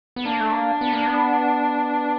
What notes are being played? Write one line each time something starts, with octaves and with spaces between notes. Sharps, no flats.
B3
A#3 D4
A3
A#3
B3
A#3
B3